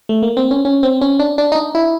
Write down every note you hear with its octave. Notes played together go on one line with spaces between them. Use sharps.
A3
A#3
C4
C#4
C#4
C4
C#4
D4
D4
D#4
D4
E4